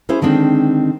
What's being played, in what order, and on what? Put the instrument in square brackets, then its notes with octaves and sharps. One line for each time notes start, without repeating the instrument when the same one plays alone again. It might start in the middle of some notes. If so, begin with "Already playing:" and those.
[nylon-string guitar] C#4 E4 G#4 C5
D3 D#3 G#3 C4 D4